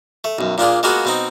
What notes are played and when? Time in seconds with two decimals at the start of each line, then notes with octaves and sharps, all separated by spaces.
0.24 A3
0.39 B1 F#2
0.58 A#2 D4 F4 G#4
0.83 G#3 A#3 B3 F4 F#4 G#4
1.05 B2 C4 D#4